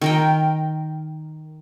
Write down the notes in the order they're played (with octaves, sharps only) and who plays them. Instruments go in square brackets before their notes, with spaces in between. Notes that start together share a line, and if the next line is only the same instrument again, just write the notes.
[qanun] D#3 A#4 G5